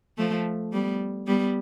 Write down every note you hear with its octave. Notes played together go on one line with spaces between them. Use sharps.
F3 A3
G3 B3
G3 B3